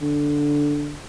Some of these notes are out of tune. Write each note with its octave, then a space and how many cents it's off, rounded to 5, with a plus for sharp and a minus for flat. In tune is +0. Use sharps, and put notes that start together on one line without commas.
D3 -5